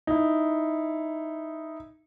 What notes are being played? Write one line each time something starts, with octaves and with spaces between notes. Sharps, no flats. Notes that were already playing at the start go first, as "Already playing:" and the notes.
D#4 E4